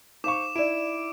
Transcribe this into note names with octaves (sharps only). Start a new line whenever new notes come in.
D#4 C5 F5 C#6 D6 E7
D#4 E4 D5 D7 E7